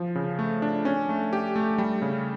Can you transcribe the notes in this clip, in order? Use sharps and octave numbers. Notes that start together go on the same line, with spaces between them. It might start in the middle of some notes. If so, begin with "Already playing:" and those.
Already playing: F3
C#3
A3
D4
C#4
A3
G4
A3
G3
C#3